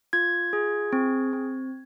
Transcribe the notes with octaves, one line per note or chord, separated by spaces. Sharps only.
F4 G#6
G#4
C4
C4